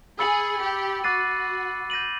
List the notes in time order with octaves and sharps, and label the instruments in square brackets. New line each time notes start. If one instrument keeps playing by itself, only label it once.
[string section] G#4 [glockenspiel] B5 E6 A6 C#7 F#7
[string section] G4
[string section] F#4 [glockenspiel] D6 F#6 A6 C7 D#7
[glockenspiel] G6 A#6 D#7 F#7